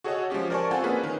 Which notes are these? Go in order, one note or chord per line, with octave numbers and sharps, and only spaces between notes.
F#4 G#4 A4 C#5 D#5 F#5
F3 G#3 C#4 G4
A#4 C5 D5 G#5 A5 C#6
C4 F4 A4 F#5 G#5
A#3 C#4 G#4 B4
D#3